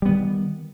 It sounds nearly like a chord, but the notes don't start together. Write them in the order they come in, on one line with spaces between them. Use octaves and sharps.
G3 B3 D#3